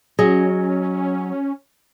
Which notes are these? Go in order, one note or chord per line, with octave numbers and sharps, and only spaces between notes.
F#3 C#4 G#4 D#5